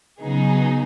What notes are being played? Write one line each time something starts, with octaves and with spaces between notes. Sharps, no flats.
C#3 F#3 B3 D#4 G#4